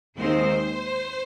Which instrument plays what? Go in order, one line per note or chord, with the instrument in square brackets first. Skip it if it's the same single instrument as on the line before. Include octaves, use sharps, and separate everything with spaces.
[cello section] D#2 D#3 G#3 C4 C5